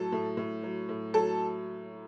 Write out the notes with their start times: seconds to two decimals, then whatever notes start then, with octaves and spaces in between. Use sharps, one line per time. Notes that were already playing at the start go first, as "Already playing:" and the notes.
Already playing: A2 F#3 A4
0.12 A2
0.37 A2
0.63 F#3
0.89 A2
1.14 F#3 A4